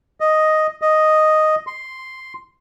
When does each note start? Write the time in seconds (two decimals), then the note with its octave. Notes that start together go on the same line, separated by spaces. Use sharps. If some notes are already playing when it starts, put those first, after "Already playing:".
0.20 D#5
0.82 D#5
1.67 C6